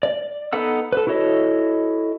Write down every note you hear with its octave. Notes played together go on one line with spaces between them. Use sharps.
D5
B3 D#4 A4 F#5 E6
A4 B4
E4 F#4 A4 C#5 D#5